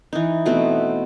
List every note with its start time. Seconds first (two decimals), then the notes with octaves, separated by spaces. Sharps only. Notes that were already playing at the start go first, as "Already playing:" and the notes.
0.13 E3 D#4
0.46 B2 A3 B3 C4